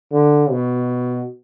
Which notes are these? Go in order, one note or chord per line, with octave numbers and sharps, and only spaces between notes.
D3
B2